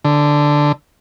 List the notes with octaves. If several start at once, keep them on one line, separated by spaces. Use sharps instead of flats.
D3